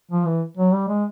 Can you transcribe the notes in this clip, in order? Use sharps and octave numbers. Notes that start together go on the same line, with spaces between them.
F3
E3
F#3
G3
G#3